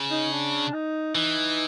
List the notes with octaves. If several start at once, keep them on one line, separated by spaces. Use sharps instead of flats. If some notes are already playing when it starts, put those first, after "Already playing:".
Already playing: C#3
D#4
D4
D#4
E3 D#4